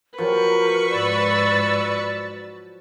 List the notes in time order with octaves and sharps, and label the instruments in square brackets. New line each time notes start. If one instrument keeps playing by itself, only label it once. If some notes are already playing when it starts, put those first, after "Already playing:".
[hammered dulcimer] F3 F#3 [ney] A#4 [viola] B4 C#6
[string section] G#2 E6 A6 [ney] D5